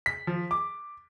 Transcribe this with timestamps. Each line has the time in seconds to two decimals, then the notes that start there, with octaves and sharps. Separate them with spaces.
0.06 B6
0.27 F3
0.51 D6